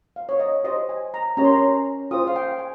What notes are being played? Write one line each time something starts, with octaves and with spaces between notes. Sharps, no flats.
F5
C#5
D#5
G4 C5 D#5
G#5
A#5
C#4 G4 A#4 C#5 A#5
C6
A#5
F4 G#4 C5 D#6
F5
G5
G#5